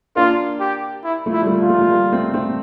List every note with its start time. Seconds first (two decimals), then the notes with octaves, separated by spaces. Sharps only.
0.16 A#3 D4 F4
0.60 G4
1.04 E4
1.26 F3 A3
1.33 E4
1.42 G3
1.47 F3 A3
1.61 F4
1.69 F3 A3
1.81 A3
1.90 G3 A#3
2.12 A3 C4
2.34 A3 C4